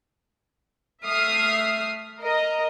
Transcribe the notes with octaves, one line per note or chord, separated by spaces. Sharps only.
A3 E5 D#6 F6 C7
A#4 D#5 A#5